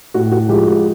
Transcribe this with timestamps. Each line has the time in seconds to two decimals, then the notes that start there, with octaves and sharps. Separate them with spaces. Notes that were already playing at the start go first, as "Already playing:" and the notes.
0.14 A2 F#4
0.31 F#4
0.49 F3 G#3 G4
0.67 F#4